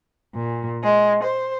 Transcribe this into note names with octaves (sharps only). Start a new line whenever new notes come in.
A#2
G#3
C5